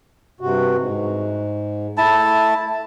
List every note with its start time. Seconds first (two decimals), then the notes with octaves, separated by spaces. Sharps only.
0.41 G2 C3 F#4
0.77 G#2
1.98 A3 E4 A5